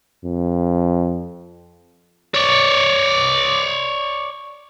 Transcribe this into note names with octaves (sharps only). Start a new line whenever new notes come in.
F2
C#5 D5